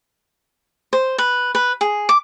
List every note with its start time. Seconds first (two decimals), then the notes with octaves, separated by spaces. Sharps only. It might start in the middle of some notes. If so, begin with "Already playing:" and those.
0.93 C5
1.18 B4
1.55 B4
1.81 G#4
2.09 D6